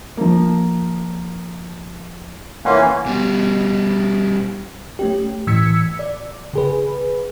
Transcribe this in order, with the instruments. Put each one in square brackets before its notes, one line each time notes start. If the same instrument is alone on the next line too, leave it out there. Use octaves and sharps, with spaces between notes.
[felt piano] F3 A#3
[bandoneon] E3 A#3 C#4 [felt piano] F#5 C6
[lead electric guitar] B2 G3
[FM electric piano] A3 C#4 G4
A2 E3 E6 G#6 B6 C#7
D5
C#3 G#4 B4